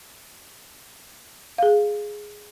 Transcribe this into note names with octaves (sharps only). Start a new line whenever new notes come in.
G#4 F5